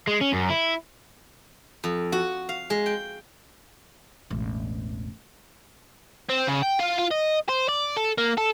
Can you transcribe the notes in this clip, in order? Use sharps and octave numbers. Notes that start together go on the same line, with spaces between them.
G#3
C#4
F#2
E4
F2
F#4
F5
G#3
G5
E1 A1
C4
C#3
G5
F4
F4
D#5
C5
D5
A4
A#3
A4